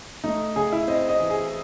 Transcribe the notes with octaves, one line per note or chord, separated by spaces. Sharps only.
A3 D#4
C#3 G#4
E4
C4 D#5
D#5
E3
G#4